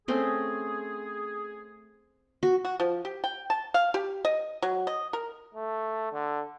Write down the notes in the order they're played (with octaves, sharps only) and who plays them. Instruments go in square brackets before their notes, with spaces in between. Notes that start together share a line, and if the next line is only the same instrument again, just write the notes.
[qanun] A3 C4 C#4 [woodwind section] G#4
[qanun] F#4
[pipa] F#4
F3
G4
G5
A5
F5
G4
D#5
F#3
D#5
A#4
[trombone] A3
D3